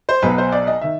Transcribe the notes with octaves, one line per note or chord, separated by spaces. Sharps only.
C5
B1 B2 F#3 B4
C5
D5
D#5
D#3 E5